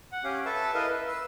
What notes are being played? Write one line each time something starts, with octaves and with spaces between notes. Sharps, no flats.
F#5
C#4 G4 F5
A4 B4 E5 A5
E4 A#4 B4 D#5 F5
B4
B4 E6